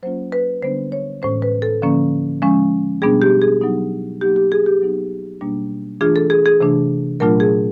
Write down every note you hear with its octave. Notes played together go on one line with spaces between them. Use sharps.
F#3 A#3 C#4 F4 C5
B4
D3 G3 B3 D4 C5
C#5
A2 E3 G#3 C#4 C5
B4
A4
D3 F3 A#3 C#4
F3 G#3 C#4
B2 G3 B3 D4 G#4
G4
G#4
F#3 B3 D#4
F#3 A#3 D#4 G4
G4
G#4
G4
F#3 B3 D#4
B2 G3 A#3 D4
E3 A3 D4 F4 G#4
A4
G#4
G#4
C3 E3 A3 D4
A#2 F#3 A3 D4 F4 A#4
G#4